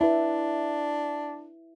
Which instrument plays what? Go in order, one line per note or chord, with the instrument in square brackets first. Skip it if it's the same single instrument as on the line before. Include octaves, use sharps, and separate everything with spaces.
[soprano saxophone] D4 [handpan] E4 B4